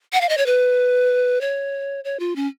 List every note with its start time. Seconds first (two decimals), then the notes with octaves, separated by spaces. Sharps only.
0.13 F#5
0.21 F5
0.29 D#5
0.38 C#5
0.46 B4
1.41 C#5
2.04 C#5
2.20 F4
2.36 C#4